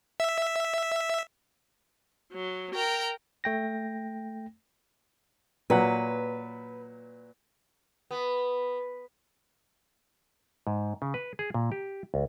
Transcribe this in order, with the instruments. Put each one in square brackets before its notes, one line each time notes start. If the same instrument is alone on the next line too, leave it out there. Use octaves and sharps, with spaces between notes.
[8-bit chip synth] E5
[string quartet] F#3
A#4 G5 A#5
[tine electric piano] A3 G5 A#6
[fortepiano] A#2 F#3 F#5 [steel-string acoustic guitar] B4
[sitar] B3
[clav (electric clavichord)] G#2
C#3
B4
G#4
A#2
G4
C#2